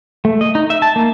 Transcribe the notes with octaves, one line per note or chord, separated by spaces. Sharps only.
A3
D#5
D#4
E5
A5
A#3